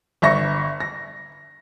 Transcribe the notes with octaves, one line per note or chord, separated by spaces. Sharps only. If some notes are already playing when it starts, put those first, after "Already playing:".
G1 E5 C#6 A#6
A#6